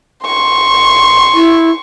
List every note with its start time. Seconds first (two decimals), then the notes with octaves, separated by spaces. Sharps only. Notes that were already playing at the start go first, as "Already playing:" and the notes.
0.25 C6 C#6
1.34 E4